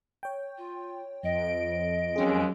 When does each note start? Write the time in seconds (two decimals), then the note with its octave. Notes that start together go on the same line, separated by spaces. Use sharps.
0.23 C#5 G5
0.57 F4
1.23 F2 D#5 D7
2.16 D#2 F#3 G#3 C#4 G#4